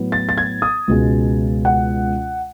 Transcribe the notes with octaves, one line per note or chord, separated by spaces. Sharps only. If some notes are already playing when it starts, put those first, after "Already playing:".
Already playing: A2 F#3 B3
A6
A6
G#6
D#6
C#2 B2 G#3
F#5